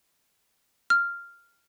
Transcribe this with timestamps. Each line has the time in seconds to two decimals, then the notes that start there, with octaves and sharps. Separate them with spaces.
0.90 F6